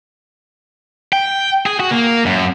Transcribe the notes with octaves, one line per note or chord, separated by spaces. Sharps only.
G5
G#4
F#4
A#3
F#2